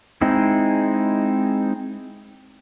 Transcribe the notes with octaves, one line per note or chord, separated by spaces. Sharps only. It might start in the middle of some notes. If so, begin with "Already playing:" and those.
G#3 C4 D#4 E4